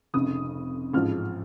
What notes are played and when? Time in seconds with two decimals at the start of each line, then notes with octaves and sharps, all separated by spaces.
0.14 F1 F2 C#3 D#6
0.93 A1 G#2 F3 F6